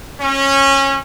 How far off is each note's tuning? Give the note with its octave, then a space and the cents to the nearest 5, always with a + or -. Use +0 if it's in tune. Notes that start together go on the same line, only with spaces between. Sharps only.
C#4 -20